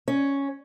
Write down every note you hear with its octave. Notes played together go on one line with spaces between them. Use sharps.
C#4